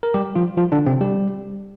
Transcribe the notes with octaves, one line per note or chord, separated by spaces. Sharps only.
A#4
G3 G4
F3 F4
F3 F4
D3 D4
C3 C4
G3 G4